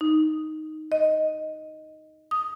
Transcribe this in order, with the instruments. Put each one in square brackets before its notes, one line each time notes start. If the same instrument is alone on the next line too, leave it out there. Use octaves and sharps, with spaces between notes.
[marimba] D#4
D#5
D#6